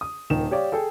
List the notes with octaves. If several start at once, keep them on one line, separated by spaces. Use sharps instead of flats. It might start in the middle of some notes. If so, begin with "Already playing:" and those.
D#6
D#1 D#3 E7
G4 C#5 D5 F5
G#4 A4 G5